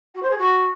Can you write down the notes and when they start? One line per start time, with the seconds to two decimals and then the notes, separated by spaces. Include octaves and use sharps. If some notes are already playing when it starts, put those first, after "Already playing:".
0.15 F#4
0.22 C5
0.30 G#4
0.38 F#4